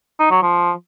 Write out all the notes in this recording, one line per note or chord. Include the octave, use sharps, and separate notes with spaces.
D#4
F#3
F3